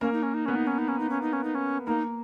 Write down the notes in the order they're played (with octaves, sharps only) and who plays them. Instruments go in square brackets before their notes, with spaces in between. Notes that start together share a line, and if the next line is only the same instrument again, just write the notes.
[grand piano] A#3 A#4 [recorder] C#4
[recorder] D#4
C#4
D#4
[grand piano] B3 B4 [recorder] C#4
[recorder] D#4
C#4
D#4
C#4
D#4
C#4
D#4
C#4
D#4
C#4
[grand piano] A#3 A#4 [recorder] D#4